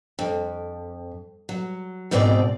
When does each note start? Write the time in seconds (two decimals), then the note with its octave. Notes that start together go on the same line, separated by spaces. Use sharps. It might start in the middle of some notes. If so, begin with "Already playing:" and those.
0.19 F2
1.49 F#3
2.11 F2 G#2 B2 C4 G4 D5